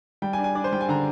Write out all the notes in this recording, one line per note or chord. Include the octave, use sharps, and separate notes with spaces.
G3 G5
G#5
D4
G#5
D4 D5
C5
G3 G5
G#5
D3 A#5